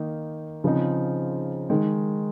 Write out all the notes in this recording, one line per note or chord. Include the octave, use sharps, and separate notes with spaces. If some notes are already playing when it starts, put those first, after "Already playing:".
Already playing: D#3 A#3 D#4
C#3 F3 C4 D#4
D#3 G#3 D#4